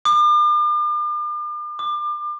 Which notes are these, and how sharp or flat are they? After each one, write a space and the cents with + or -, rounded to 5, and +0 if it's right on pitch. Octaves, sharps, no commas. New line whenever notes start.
D6 +40
D6 +35